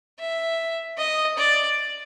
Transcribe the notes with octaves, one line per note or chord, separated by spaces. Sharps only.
E5
D#5
D5